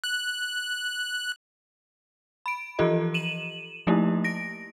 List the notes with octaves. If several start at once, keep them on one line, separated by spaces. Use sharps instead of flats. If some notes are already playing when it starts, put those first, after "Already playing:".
F#6
B5 D7
E3 F3 F4 G4 A4 D#5
D#7 E7 F#7
F3 A3 A#3 D#4 E4 G4
A#6 D7